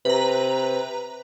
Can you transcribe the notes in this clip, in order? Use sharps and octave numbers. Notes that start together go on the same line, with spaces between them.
C3 B4 A#5